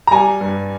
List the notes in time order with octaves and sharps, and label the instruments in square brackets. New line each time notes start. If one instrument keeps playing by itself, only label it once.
[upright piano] A#5
G3 G#5
G2